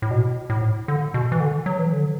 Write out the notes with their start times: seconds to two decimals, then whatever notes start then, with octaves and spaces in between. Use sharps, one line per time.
0.02 A2
0.11 B2
0.50 A2
0.88 D3
1.14 B2
1.32 E3
1.40 D3
1.66 F#3
1.79 E3
1.93 D3